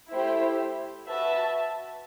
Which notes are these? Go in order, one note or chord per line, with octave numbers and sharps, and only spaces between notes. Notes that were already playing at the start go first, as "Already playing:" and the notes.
A3 E4 G4 C5
F#4 B4 E5 A5